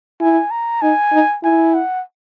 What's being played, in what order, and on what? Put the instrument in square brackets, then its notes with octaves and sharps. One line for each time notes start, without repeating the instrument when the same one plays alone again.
[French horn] E4 [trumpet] G#5
[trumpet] A#5
[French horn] D#4 [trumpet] G#5
[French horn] D#4
[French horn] E4 [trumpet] G#5
[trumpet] F#5